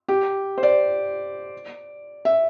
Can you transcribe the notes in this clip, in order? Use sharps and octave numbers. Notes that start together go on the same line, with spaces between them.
G4
C5
D5
E5